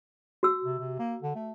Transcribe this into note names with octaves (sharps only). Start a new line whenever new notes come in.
F#4 E6
C3
C3
A#3
D3
A3